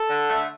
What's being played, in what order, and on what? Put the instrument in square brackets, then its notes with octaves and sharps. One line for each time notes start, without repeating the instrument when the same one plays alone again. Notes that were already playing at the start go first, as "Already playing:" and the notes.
Already playing: [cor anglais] A4
[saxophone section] D3
A3